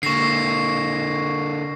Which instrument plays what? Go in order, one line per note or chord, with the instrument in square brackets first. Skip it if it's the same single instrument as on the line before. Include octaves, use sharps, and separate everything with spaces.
[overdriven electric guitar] D3 A#3 [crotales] C#6 A#6 C7